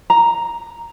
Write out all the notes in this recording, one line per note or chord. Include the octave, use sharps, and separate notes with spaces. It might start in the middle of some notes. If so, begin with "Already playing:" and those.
A#5